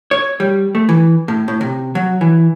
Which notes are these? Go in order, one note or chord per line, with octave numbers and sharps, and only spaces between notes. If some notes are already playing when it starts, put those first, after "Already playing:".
C#5
G3
A3
E3
A2
A2
C3
F#3
E3